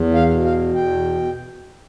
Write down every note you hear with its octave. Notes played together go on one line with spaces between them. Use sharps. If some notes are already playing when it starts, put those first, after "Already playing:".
Already playing: E2
F5
B2
F5
E2 G5